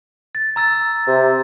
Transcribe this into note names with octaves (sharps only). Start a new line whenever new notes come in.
A6
A#5 E6 A6
C3